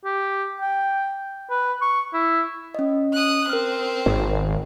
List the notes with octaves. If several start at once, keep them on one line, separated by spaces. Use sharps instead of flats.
G4
G5
B4
C#6
E4
C#4 D#5
D#6 F#6
C4 A#4 F6
G#1